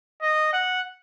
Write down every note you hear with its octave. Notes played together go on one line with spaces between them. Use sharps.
D#5
F#5